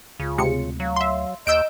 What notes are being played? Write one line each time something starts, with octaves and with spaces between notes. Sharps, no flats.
C#2 C#3 F4
D2 C3 G#3 C#7
F#3 F5
E5 C6
D#2 D#5 E6 G6 D7